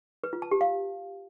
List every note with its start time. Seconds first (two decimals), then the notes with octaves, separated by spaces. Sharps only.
0.24 B4
0.33 F4
0.42 A5
0.51 G4
0.61 F5